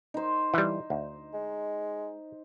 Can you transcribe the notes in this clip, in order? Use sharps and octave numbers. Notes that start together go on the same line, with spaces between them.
D#4 C5
E3 G3
D2
G#3